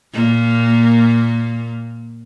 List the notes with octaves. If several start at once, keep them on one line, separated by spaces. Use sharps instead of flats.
A#2 A#3